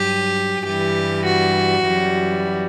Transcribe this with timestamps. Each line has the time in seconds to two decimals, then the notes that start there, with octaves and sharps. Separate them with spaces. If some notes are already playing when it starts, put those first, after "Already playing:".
Already playing: G2 F#3 G4
0.66 G2 E3 G3 G4
1.25 F#4
1.85 F#2 E3 G3